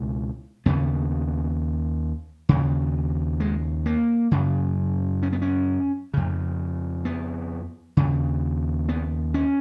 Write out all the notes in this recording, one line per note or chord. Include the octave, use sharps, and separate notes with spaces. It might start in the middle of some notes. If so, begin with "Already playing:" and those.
Already playing: C#2 B2
D#2 C#3 B3
D#2 C#3
G#3
A#3
F#2 C#3
C#4
B3
C#4
F2 C#3
B3
D#2 C#3
B3
C#4